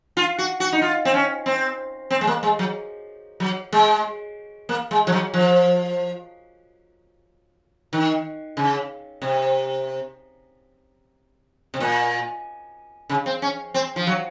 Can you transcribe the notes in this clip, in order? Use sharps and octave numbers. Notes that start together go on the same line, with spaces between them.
F4
F#4
F#4
D#4
F4
C4
C#4
C4
C4
G#3
A#3
G#3
F#3
F#3
G#3
A#3
G#3
F3
F#3
F3
D#3
C#3
C3
C3
A#2
C#3
C4
C#4
C4
F3
F#3